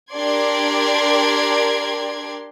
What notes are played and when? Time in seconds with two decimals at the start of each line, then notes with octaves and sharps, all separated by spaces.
0.13 D4 G4 A#4 D5 C6 G#6